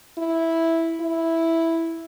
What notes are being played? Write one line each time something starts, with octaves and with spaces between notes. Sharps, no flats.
E4
E4